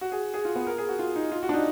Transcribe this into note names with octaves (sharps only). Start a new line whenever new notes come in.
F#4
G#4
G#4
F4
B3
A#4
G#4
F#4
F4
D#4
F4
F#4
D4
D#4